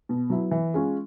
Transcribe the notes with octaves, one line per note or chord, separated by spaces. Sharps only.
B2
F#3 B3 E4
E3
G#3 C#4 F4